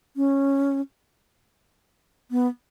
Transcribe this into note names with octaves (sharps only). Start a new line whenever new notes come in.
C#4
B3